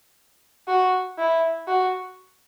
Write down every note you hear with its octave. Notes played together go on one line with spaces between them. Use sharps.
F#4
E4
F#4